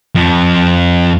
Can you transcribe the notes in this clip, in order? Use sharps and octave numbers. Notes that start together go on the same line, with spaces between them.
F2 F3